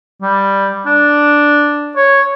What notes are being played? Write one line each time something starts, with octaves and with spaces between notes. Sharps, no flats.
G3
D4
C#5